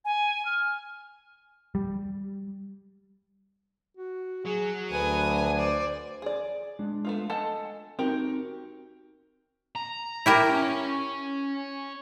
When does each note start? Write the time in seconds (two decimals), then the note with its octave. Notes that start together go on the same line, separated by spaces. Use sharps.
0.05 G#5
0.45 F6
1.75 G3
3.97 F#4
4.45 F#3 G#4
4.91 D2 B4 G#5 D#6
5.58 C5 D5
6.22 G#4 D5
6.79 G#3 D4
7.05 A3 B3 F4
7.30 A4 D#5 F#5 G#5 A5
7.99 C4 D#4 F#4 G4 A#4
9.75 A#5
10.26 E4 G4 A#4
10.50 C#4